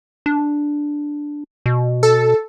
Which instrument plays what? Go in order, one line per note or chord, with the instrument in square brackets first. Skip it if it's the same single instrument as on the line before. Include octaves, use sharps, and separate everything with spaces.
[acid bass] D4
B2
[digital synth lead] A4